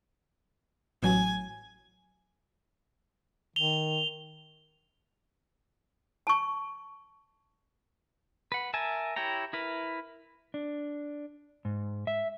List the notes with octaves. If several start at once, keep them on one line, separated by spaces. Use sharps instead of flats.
A1 F#3 G#5
D#3 F7 G7
A5 C#6
B4 F#5
A#4 E5 G#5 A5
E4 G4 C#5 G5 A#5
E4 A#4 B4
D4
G#2
E5